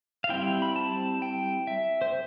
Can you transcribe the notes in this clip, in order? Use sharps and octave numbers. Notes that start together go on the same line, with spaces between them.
F5
G3 C4 E4 G5
B5
A5
G5
E5
C5